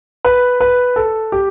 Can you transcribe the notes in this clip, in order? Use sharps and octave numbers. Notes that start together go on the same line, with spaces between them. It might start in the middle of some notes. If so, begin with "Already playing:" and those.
B4
B4
A4
G4